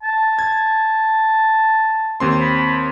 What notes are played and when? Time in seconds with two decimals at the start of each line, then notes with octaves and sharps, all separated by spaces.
0.03 A5
0.39 G#6
2.20 D#2 C4 C6
2.41 B5